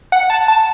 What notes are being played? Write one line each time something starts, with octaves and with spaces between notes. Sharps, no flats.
F#5
A5
A5